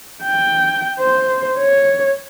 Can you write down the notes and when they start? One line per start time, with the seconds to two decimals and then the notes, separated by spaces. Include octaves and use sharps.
0.23 G5
0.99 C5
1.59 C#5